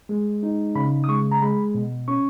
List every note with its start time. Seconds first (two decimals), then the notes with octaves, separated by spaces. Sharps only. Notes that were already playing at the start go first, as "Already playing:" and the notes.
0.09 G#3
0.43 D#4
0.75 C#3 B5
1.04 D#6
1.08 G#3 C#6
1.32 A#5
1.42 G#3 B5
1.75 B2
2.08 C#4 C#6